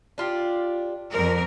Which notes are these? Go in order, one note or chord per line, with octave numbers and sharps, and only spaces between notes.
D4 F4 G4
F2 F3 A#4 D5